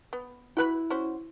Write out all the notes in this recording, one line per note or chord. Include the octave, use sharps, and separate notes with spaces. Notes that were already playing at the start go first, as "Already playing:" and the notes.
B3
E4 F#4 B4 B5
C#4 F#4 C5